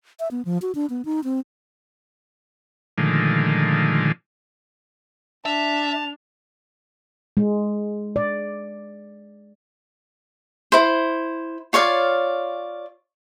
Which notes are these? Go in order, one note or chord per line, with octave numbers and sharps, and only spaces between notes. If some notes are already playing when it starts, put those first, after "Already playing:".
E5
B3
F3
F#4
D4
B3
D#4
C4
A#2 D3 D#3 F3 G#3 A3
D4 E5 A5 F7
G#3
D5
E4 C5
F4 C#5 D5 F5